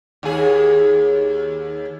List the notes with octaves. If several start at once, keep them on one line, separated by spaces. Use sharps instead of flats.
D#2 G#4